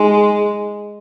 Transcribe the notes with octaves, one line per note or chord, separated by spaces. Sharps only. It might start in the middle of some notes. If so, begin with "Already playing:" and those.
Already playing: G#3 D#4 G#4 G#5 C6